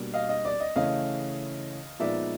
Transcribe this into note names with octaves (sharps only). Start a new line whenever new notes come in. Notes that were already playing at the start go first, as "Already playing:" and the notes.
Already playing: B2 G3 A#3 D4
D#5 F5
D#5
D5
D#5
C#3 E3 A3 C#4 D#5 F5
A#2 F3 G#3 B3 D#4 D5 E5